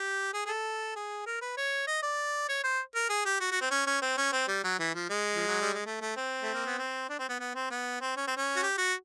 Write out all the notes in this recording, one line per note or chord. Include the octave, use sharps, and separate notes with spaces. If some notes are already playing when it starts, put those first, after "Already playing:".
Already playing: G4
G#4
G#4
A4
G#4
A#4
B4
C#5
D#5
D5
C#5
C5
A#4
G#4
G4
F#4
F#4
C4
C#4
C#4
C4
C#4
C4
G3
F#3
E3
F3
G#3
F3
F#3
G3
G#3
A3
A3
C4
A3
A#3
B3
C4
D4
C4
B3
B3
C4
B3
C4
C#4
C4
C#4
F#4
G4
F#4